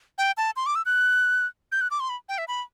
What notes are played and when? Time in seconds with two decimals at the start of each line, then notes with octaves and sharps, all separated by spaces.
0.18 G5
0.37 A5
0.56 C6
0.66 D6
0.75 E6
0.86 F#6
1.72 G6
1.81 F#6
1.91 D6
2.00 C6
2.09 B5
2.29 G5
2.38 E5
2.48 B5